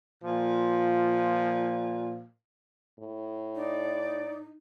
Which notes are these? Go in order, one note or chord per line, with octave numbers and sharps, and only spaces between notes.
A#2 F3
A2
D#4 D5